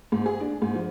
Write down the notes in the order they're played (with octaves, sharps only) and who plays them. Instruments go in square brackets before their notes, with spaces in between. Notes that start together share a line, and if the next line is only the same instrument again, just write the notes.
[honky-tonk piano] G#2
G#4
D4
G#2
F3